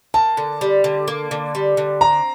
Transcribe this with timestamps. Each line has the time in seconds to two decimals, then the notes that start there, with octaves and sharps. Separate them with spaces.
0.14 A#3 A5
0.37 D3
0.61 G3
0.84 D3
1.08 A#3
1.31 D3
1.55 G3
1.77 D3
2.01 C4 A#5